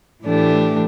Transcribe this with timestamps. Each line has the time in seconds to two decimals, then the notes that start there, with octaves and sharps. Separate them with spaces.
0.23 A2 E3 A3 D4 G4